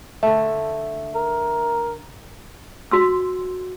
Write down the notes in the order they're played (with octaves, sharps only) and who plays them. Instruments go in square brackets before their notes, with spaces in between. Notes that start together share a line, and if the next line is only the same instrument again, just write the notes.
[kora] D3 A3 [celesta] E5
[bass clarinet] A#4
[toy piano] F#4 C6 E6